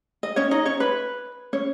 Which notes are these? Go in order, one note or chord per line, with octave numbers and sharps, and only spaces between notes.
D#5
C#4 C#5
D#4 D#5
C#4 C#5
B4
C#4 C#5